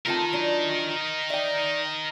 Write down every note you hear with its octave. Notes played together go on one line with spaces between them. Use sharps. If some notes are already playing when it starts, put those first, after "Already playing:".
A3 C4 D#4 F4 A#4 A5
F#3 D4
D5 E5 G5